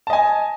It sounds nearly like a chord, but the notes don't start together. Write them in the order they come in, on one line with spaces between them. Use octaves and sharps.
A5 D#5 G#5